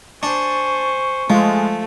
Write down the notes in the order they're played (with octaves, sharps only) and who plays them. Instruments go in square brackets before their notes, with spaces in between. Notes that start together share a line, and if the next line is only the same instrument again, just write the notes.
[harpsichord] D4 [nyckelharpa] C5 G#5 [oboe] C#6
[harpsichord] F3 [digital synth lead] G#3 [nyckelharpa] A3